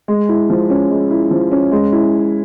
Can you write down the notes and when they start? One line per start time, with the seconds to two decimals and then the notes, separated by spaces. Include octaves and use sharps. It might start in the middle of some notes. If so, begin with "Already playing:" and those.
0.08 G#3
0.29 E4
0.50 F3
0.70 C#4
0.90 G#3
1.11 E4
1.31 F3
1.52 C#4
1.72 G#3
1.92 E4